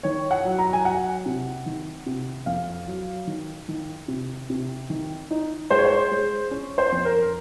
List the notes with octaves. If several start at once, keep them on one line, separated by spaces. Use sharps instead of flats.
D#3 C#5
F#5
F#3
A#5
G#5
F#3 F#5
C3
D#3
C3
F2 F5
F#3
D#3
D#3
C3
C3
D#3
D#4
G#3 C5
C#5
C5
G#3
C#4
C5
F2
A#4